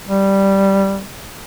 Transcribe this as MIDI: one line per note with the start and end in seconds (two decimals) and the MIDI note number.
0.08 1.03 55